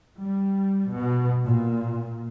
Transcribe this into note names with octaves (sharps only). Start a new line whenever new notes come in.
G3
B2
A#2